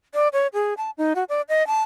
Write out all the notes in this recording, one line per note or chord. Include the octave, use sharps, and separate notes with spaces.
D5
C#5
G#4
A5
D#4
F#4
D5
D#5
A5